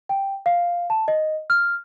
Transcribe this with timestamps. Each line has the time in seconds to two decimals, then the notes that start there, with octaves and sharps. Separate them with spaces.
0.09 G5
0.46 F5
0.90 A5
1.08 D#5
1.50 F6